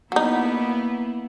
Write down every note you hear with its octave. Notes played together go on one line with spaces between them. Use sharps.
F#3 A#3 B3 D#4 E4